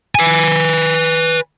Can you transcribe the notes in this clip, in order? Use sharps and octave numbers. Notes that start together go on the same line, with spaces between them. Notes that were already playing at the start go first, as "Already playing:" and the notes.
B4 G#5